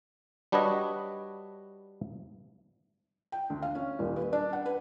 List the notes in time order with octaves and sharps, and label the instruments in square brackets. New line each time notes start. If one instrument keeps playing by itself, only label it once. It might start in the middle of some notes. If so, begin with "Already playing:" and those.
[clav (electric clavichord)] G3 D4 F#4 B4 C#5 D#5
[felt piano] G5
D2
F5
C#4
D#1
B4
D4
F#5
B4